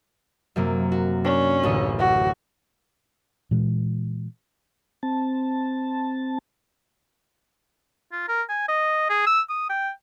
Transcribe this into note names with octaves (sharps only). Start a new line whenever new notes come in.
F#2 C3 A#3
F#4
C#4 D4
A1 D2 D#5
F#4
A#2 E3 G#3
C4 A5
F4
A#4
G#5
D#5
G#4
E6
D#6
G5